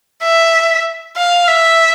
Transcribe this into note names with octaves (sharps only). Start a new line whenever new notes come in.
E5
F5
E5